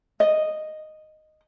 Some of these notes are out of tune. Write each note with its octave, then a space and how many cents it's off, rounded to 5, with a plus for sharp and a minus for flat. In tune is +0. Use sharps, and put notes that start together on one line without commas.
D#5 -5